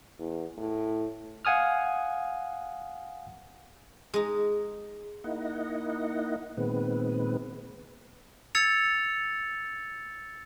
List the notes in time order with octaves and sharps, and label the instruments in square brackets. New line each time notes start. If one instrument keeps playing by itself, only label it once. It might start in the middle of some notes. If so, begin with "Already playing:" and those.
[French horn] E2
A2
[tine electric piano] F5 F#5 G#5 D#6 F6
[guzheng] G#3 D#4
[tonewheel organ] A#3 D#4 E4 D#5 F#5
A#2 D#3 G#3 B3 C4 B4
[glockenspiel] E6 G#6 A6 C#7 F7